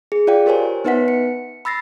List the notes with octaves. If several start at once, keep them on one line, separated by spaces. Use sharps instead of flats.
G#4
F4 D5 F5 G5
G4 A#4 C5 C#5 G#5
B3 D#4 B4 E5 F#5 B6
C#7
B5 E6 A6 A#6 C7